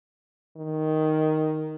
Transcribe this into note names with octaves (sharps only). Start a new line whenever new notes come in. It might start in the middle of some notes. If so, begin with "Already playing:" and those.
D#3